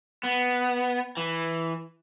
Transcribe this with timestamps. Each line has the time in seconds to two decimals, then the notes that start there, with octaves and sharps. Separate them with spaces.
0.23 B3
1.17 E3